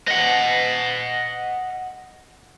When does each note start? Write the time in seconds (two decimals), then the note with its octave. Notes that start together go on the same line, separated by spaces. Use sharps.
0.08 D#5 F#5